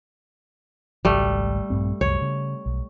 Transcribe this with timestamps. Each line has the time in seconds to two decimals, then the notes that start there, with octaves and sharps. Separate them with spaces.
1.05 G#1 C#2 G3 A3
1.70 A#1 G2 C4
2.01 C2 F#2 C#5
2.22 C#3
2.66 B1